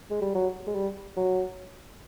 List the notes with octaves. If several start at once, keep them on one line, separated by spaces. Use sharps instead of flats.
G#3
G3
F#3
G#3
G3
F#3